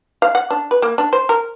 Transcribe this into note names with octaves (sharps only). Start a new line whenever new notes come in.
F5
F#5
D4
B4
A#3
D4
C5
A#4